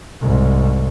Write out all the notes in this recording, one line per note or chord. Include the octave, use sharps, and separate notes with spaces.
C2 G#2